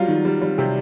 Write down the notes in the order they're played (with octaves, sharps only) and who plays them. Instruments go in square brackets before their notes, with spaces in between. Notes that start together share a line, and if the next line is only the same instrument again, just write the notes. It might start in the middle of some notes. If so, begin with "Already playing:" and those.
Already playing: [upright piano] F#3 G3 F4
D#3
G3
G3
C3 G4